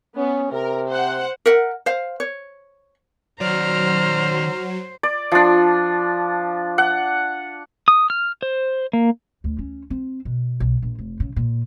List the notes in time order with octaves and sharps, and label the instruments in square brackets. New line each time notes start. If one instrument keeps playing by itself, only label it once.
[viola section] B3 [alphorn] C#4
[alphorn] C3 [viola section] A#4
[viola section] C5 F#5
[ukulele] A#4 E5 F#5
C5 F5
C#5
[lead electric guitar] D#3 D5 [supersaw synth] F#3 [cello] C5 [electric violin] A#5 F6
[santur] D5
F3 D4
F#5
[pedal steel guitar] D#6
F6
C5
A#3
[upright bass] D2
C#4
C4
B2
B1
A#1
F1
C#3
A#2